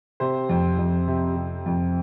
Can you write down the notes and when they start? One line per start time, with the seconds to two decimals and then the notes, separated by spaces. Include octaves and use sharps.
0.20 C3 C5
0.49 F2
0.78 F2
1.08 C3
1.36 C3
1.66 F2